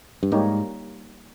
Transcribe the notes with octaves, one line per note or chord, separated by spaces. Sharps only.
G2
G#2 G3 A#3 D#4 G4 C#5